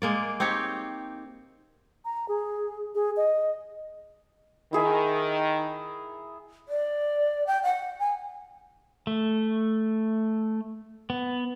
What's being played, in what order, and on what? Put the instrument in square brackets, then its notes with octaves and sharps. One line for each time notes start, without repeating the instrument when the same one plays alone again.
[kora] G#3 A#3 D5
C4 D#4 G4 C#5
[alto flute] A#5
G#4
G#4
D#5
[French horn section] D#3 [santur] E4 G#4 E5
[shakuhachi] D5
G5
F#5
G#5
[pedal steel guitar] A3
B3